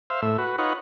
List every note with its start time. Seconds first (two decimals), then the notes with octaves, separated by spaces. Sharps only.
0.10 C5 E5 F5
0.22 A2 E5
0.38 F#4 B4
0.58 D#4 F4 B4 C#5 F#5